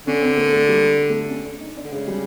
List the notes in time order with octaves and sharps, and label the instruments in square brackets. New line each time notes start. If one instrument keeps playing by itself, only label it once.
[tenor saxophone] D3 [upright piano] C#4
[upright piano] C4
A#3
A3
G3
A3
C#4
D4
D#4
D4
[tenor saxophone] D3
[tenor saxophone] C#3 [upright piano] G#3
[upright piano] G3